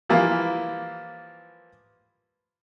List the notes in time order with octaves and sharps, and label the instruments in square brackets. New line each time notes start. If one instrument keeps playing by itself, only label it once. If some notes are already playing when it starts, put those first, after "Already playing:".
[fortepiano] E3 F3 G3 A#3 E4 F4